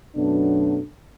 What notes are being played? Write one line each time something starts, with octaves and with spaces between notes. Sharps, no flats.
F#2 B2 F#3 A3 B3 D4